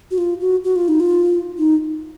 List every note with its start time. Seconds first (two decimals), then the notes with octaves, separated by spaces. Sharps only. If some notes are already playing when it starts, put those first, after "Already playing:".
0.11 F#4
0.18 F4
0.40 F#4
0.64 F#4
0.76 F4
0.88 D#4
1.00 F4
1.58 D#4